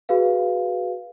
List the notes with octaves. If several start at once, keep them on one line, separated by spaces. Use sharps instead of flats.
F#4 G#4 B4 F5